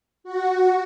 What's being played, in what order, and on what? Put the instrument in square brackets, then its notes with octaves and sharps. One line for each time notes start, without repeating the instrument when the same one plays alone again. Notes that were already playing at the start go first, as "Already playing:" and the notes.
[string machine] F#4